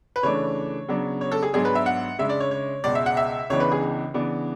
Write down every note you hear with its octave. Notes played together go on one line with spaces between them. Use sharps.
B4
C#3 E3 A3 D4 C#5
C#3 F#3 B3 D4
C#5
A4
G#4
G#2 F#3 B3 D4 G#4
B4
E5
F#5
C#3 G#3 D4 E5
D5
C#5
C#5
C#2 B2 G#3 D5
E5
F#5
E5
C#2 C#3 E3 B3 D4 C#5
B4
G#4
C#3 E3 B3 D4